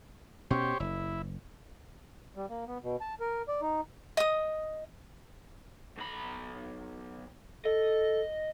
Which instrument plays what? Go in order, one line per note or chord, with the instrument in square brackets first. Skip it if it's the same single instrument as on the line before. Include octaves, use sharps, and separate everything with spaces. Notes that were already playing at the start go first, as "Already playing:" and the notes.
[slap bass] B2 C#4 [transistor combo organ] G4 C5 C#5
[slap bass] F#1 [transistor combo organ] E4
[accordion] G3
A#3
B3
B2
A5
A#4
D5
D#4
[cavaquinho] D#5 D#6
[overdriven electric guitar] B1 B5
[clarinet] A4 [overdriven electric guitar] D#5